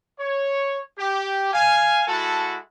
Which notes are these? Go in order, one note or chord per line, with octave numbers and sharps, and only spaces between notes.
C#5
G4
F5 G#5
G#3 E4 F#4 A4 F#5 A5